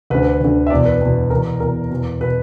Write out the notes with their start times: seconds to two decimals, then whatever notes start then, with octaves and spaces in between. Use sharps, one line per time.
0.10 D2 D3 B4
0.41 D2 D3
0.67 E5
0.70 E2 B2 D5
0.86 B4
1.01 E2 B2
1.30 E2 B2 A#4
1.60 E2 B2 A#4
1.91 E2 B2
2.21 B2 B4